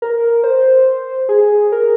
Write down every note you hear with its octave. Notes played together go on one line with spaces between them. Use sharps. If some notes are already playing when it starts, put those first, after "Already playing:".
A#4
C5
G#4
A#4